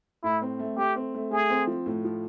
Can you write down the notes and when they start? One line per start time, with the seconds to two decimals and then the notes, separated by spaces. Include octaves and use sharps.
0.24 A2 E4
0.42 C4
0.59 A3
0.77 A3 G4
0.96 C4
1.15 A3
1.31 A3 G#4
1.50 C4
1.67 F3
1.86 A2
2.05 F3